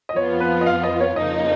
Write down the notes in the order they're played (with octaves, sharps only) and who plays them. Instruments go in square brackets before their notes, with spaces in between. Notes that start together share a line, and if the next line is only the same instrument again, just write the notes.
[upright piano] D#5
[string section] F2 F3 B3 F4 [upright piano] C#5
[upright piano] B4
D#5
F5
D#5
C#5
[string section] F2 C#3 F3 A#3 D#4 [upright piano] D#5